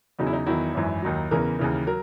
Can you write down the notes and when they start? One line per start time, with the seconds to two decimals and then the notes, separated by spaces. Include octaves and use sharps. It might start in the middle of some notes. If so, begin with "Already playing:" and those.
0.19 E2 C#3 F#3 D#4
0.27 E4
0.33 D#4
0.46 E2 D#3 F#3 E4
0.75 G#1 F#2 E3
1.02 D#2 D#3 F#3
1.31 E2 C#3 E3 A#4
1.59 D#2 C#3 E3
1.87 F#3 A#4